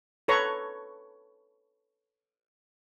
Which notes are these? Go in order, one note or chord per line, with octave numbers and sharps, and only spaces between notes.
A4 B4 C#5 A#5 C#6